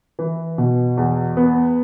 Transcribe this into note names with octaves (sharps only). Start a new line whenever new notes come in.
E3
B2
E2
B3